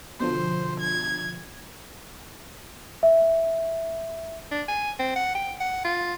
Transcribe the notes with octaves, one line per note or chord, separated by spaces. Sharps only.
B2 D3 F3 C5
G#6
E5
D4
G#5
C4
F#5
G5
F#5
F4